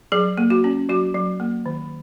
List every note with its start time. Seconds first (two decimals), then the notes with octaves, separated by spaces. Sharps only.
0.12 F#3 G#4
0.38 A#3
0.50 F#4
0.64 C#4
0.89 F#3 F#4
1.15 F#3
1.40 A#3
1.66 D#3